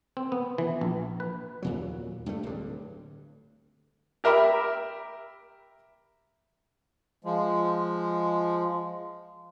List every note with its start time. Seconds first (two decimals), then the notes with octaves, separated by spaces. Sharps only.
0.17 C4
0.32 B3
0.58 E3
0.81 A#1
1.20 B4
1.62 D#2 A#2 F#3
2.26 G2 A3
2.43 D1 G2 D3
4.24 G4 A#4 E5 B5
7.24 F3 G#3